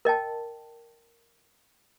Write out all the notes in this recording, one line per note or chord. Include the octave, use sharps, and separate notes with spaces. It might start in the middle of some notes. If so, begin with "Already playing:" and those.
A#4 D#5 G5 A5